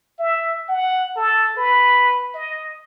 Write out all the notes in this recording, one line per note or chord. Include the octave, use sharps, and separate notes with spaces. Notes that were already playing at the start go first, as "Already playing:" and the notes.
E5
F#5
A4
B4
D#5